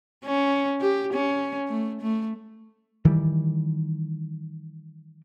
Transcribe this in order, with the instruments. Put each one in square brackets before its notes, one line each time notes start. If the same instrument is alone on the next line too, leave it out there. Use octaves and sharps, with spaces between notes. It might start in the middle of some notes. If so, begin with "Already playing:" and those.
[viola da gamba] C#4
G4
C#4
A3
A3
[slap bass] D#3 E3 G3